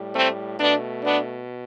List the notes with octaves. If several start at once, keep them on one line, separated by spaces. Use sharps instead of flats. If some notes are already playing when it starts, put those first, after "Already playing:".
Already playing: A2 G3
A3 C4
B2 A3 B3 D4
B3 D4